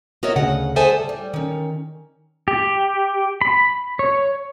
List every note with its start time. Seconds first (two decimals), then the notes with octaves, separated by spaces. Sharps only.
0.23 B3 F#4 A#4 C#5 D#5 E5
0.36 D2 C#3 F#5
0.76 G#4 A4 C5 E5 G#5 A5
0.90 G3
1.09 G3
1.34 D#3 C#4
2.48 G4
3.41 B5
3.99 C#5